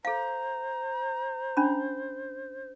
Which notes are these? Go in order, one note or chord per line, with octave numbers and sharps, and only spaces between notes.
A4 C5 F5 A#5
C#4 D4 B5